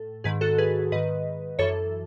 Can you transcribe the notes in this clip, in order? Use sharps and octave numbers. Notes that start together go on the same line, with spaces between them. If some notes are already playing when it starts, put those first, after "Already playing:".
Already playing: A2 A4
G#2 D#3 G#4 B4
F#4 A4
G#4 B4
G#2 D#3 B4 D#5
F#2 E3 A4 C#5